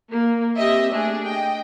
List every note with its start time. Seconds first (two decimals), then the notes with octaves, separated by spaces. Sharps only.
0.12 A#3
0.57 C4 G4 D#5 E5
0.92 A3 D4 G#4
1.26 D#5 G5